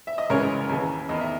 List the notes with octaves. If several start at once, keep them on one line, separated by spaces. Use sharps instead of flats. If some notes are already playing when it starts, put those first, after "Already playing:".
E5
D#5
C#2 C#3 E3 A#4 C#5
D#2 C#3 E3
E2 D#3 D#5
E5